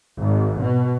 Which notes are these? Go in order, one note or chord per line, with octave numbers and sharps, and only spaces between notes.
G#1
B2